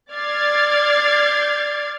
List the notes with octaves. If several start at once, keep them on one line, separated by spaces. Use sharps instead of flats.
D5 F6 G#6 A6 C7